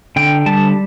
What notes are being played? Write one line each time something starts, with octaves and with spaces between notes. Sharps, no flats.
D3 G5
G3 A5